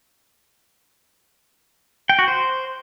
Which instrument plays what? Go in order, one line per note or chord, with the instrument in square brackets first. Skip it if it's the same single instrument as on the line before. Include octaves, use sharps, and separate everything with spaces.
[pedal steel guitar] G5
F#4
C5